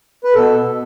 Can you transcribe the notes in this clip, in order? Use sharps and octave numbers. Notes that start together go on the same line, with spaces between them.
B4
B2 A4
B2